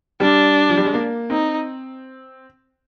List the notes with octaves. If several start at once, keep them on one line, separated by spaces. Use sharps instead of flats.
G3 D4
F3
G3
G#3
A#3
C4 D#4